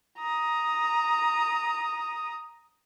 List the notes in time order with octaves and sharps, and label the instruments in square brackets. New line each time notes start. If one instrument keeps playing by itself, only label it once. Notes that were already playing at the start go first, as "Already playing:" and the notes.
[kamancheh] A#5 D#6